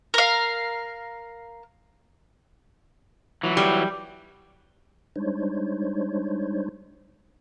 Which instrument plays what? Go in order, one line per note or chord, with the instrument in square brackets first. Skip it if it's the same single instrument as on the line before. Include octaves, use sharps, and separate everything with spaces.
[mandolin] A#4 F5
[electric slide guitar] E3 F#3
[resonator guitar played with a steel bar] G3
[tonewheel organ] G3 G#3 D4 D#4 C5 C#5